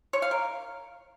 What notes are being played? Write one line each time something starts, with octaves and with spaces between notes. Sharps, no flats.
C#5
F5
A#4